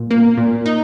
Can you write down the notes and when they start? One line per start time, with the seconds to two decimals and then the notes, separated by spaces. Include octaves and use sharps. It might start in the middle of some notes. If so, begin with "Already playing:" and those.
Already playing: A#2
0.11 A#3
0.38 A#2
0.66 D#4